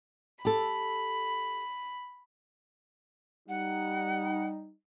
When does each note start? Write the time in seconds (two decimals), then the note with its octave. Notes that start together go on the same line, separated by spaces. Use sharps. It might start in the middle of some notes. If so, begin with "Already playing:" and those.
0.45 G4 A4 B5
3.49 G3 D#4 F#5